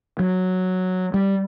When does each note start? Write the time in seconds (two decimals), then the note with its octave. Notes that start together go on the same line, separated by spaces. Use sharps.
0.19 F#3
1.14 G3